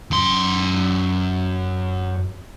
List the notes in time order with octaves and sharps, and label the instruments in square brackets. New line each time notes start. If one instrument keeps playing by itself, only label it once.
[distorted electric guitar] F#2 C6